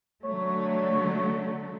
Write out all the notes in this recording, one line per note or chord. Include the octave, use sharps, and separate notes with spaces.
D3 F#3 A3 C#5